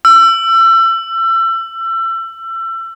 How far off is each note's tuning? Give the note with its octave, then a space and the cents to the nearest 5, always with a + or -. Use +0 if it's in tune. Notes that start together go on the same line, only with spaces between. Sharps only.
E6 +30